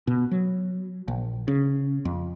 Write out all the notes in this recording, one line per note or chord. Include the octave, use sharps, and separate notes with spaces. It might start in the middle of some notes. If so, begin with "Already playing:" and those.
B2
F#3
A#1
C#3
F2